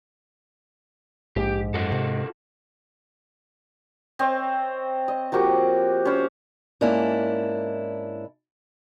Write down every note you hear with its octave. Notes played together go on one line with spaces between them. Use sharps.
A#1 G#2 G4
F#2 F4 F#4 A4
C3
C4 C#5 D#5
D#5
F3 A#3 F#4 G4
C#4 C5
G#2 A#3 C#4 D4 E4